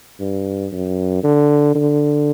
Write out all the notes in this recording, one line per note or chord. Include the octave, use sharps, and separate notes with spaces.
G2
F#2
D3
D3